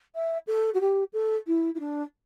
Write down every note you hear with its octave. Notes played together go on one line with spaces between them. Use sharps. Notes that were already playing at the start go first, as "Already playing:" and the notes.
E5
A4
F#4
G4
A4
E4
E4
D4